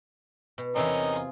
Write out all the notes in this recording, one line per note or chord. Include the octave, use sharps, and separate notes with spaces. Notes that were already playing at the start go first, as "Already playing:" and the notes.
B2
E2 C3 C4 C#4 A#4 D#5
F4 G#4